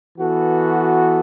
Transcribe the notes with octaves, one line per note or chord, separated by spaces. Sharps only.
E3 B3 F#4 A4